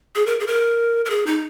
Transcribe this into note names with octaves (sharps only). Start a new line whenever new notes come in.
G#4
A#4
G#4
A#4
A#4
G#4
D#4